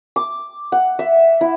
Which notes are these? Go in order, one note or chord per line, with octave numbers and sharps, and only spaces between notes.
D6
F#5
E5
E4